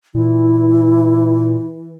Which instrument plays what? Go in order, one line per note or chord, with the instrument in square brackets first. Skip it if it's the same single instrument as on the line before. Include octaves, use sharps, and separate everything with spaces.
[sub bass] A#2 [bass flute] E3 [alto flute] E4